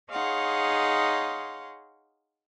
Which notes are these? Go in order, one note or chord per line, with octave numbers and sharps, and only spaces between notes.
D#4 G#4 C#5 F5 F#5 C6